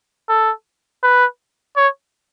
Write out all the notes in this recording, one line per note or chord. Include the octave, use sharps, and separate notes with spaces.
A4
B4
C#5